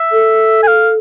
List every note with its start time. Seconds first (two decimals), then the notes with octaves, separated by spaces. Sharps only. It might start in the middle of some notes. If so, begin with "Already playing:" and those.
Already playing: E5
0.12 A4
0.63 G#5
0.67 F5